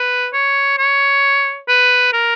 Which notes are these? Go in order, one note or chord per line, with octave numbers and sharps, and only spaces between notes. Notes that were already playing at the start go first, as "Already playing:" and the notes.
Already playing: B4
C#5
C#5
B4
A#4